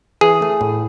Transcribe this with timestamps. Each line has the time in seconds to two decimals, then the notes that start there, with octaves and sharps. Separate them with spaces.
0.21 E3 G#4
0.42 A3
0.61 A2